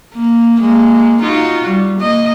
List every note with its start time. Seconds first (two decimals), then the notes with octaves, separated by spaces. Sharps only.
0.15 A#3
0.60 G#3 A#3
1.22 D#4 F4 F#4
1.67 G3
1.99 A#3 D#5